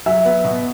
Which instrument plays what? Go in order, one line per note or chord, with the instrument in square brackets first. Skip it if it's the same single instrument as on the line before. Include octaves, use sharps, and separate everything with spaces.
[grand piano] F#3 [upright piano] E5
[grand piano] B3
B2